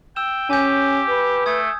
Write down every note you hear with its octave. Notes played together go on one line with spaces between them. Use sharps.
G5 E6 E7
C#4 G4 G#5 G6
B4
A3 D#6 G#6